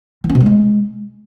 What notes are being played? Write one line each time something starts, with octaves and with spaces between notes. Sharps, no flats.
E3
C#4
B2
G2
G#3